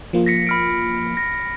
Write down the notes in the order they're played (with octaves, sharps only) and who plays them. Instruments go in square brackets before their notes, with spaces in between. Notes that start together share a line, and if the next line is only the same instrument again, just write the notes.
[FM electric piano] F3 A#3 F4
[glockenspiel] A#6 B6 C#7
B5 F6 D7
A#6